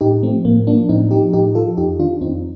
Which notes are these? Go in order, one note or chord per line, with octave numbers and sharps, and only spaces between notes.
A2 D#4 G4
F3 A3 C4
A2 A#3
F3 A#3 D4
A2 C4 D#4
F3 D#4 G4
A2 D#4 G4
F3 F4 A4
F2 D#4 G4
D#3 D4 F4
F2 C4 D#4